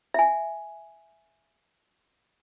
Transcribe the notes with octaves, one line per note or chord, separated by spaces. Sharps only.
E5 G#5